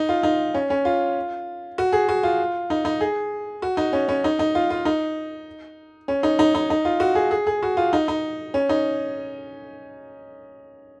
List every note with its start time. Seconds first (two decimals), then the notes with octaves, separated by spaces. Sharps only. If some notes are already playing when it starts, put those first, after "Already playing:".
Already playing: D#4
0.09 F4
0.23 D#4
0.54 C#4
0.70 C#4
0.85 F4
1.78 F#4
1.92 G#4
2.09 F#4
2.23 F4
2.70 D#4
2.85 D#4
3.01 G#4
3.62 F#4
3.77 D#4
3.93 C#4
4.08 C#4
4.24 D#4
4.39 D#4
4.55 F4
4.70 F4
4.85 D#4
6.08 C#4
6.23 D#4
6.39 D#4
6.55 D#4
6.70 D#4
6.85 F4
7.00 F#4
7.15 G#4
7.31 G#4
7.47 G#4
7.63 F#4
7.77 F4
7.93 D#4
8.08 D#4
8.54 C#4
8.69 D#4